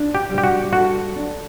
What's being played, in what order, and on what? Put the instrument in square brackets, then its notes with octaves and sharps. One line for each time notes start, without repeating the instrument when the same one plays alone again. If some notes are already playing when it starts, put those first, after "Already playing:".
Already playing: [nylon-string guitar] D4
[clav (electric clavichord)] G4
[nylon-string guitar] G3
[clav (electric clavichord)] G4
F#4
[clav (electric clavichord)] F#4 [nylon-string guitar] A4
[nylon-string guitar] D4